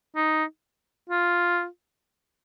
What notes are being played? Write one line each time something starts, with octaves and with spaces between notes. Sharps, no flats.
D#4
F4